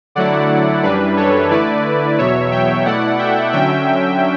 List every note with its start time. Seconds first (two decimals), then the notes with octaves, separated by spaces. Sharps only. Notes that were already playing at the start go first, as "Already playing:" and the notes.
0.15 D3 F#3 A3 E4 D5 F#5
0.83 F#2 E3 G3 D4 B4 D5
1.17 A4 C#5
1.51 D3 A3 E4 B4 D5
2.18 E2 B2 F#3 C#5 E5
2.51 E5 G5
2.85 B2 A3 E4 D5 F#5
3.19 E5 G5
3.53 D3 F#3 C#4 E5 G5